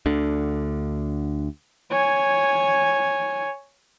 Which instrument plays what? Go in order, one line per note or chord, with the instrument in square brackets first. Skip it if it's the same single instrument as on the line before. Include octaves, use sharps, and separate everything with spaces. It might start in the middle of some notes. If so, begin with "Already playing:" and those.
[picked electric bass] D2 D3
[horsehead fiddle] C#5 G#5